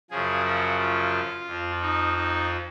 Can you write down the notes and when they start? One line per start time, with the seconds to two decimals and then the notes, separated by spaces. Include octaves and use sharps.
0.11 F#2 C#3 F3 G#4
0.45 F#4
0.79 F4
1.47 F2 F3
1.81 D#4
2.16 D#4